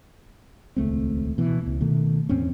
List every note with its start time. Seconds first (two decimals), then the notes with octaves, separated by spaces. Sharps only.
0.76 D#1 C#2 A3 C4
1.38 B2 E3
1.67 C#2
1.81 B2 D#3 A3
2.29 E2 A2 C4 C#4